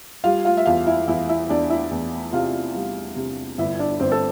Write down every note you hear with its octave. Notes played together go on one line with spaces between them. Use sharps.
G3 F4 F5
F4 F5
E5
E2 F4 F5
E4 E5
E2 E4 E5
E4 E5
E2 D4 D5
E4 E5
E2
C3 F4 F5
G3
C3
G1 E4 E5
D4 D5
G1 C4 C5
A4